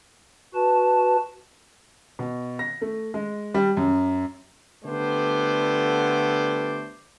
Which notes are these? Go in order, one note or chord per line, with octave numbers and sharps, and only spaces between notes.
F#4 B4 A5
B2
A#6
A3
G#3
G3
F#2
D3 G3 A3 B3 C5 D5